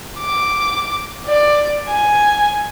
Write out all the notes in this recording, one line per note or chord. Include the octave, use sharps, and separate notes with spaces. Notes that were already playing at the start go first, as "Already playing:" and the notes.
D6
D5
G#5